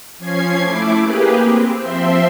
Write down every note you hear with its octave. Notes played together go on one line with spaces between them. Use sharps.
F3 C#4 G#6 C7
A3 E4 D6
A#3 G4 G#4 B4
C4
F3 C4 E5 C6